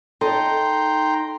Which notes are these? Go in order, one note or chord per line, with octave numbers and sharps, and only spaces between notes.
D#4 A4 D#5 G5 A#5 C6